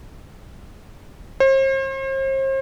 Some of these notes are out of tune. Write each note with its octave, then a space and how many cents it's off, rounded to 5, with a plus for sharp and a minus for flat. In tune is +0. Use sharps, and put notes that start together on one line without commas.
C5 +40